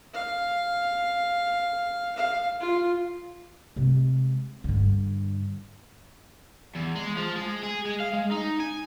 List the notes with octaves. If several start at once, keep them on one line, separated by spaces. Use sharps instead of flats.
F5
F5
F4
C3 G#3
G2 D3
E2
G#3
F3
G#3
G#4
G#3
F5
G#3
D#4
G#5